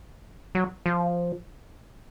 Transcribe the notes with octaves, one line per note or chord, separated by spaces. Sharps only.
F#3
F3